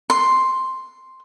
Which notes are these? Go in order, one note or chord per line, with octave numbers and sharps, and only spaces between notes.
C6